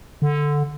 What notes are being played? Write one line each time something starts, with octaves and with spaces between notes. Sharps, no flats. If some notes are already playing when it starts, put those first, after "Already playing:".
D3